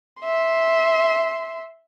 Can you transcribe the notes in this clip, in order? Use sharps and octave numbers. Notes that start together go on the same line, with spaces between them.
E5 C6